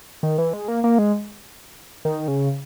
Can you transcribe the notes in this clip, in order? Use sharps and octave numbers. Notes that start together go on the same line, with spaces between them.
D#3
E3
G#3
A#3
A#3
G#3
D#3
C#3